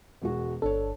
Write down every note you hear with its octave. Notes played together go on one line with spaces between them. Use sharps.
E1 G#3 F#4
G1 D4 A4 C#5